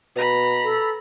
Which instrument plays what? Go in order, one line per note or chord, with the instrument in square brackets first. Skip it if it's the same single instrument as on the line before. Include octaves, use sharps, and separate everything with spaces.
[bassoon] B2 [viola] A#5 B5
[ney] A4